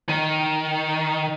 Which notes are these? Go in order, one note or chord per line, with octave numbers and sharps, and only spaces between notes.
D#3